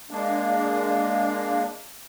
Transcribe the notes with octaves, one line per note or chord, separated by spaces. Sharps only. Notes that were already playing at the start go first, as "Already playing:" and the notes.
G#3 A#3 D4